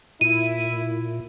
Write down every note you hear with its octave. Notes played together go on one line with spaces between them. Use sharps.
A#2 E4 D#7